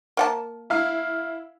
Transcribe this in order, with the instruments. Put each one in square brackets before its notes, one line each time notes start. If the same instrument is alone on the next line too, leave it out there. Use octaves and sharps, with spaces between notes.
[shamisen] A#3 F#5 A5
[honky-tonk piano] E4 F5